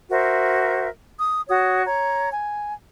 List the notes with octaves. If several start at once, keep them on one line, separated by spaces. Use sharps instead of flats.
F#4 A#4 C5 E5
D#6
F#4 C#5 D#6
C#5 A#5
G#5